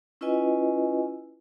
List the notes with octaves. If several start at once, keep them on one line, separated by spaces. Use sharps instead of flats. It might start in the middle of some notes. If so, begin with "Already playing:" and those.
C#4 E4 F4 B4 D#5 G#5